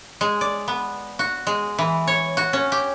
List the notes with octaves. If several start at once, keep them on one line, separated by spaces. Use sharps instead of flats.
G#3
D5
B3
F#4
G#3
E3
C#5
F#4
C#4
G4